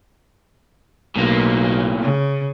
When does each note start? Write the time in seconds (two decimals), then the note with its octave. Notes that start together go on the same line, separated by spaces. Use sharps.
1.16 B1 A2 A#3
2.02 C#3